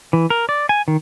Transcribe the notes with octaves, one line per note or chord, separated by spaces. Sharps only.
E3
A#4
D5
G#5
D#3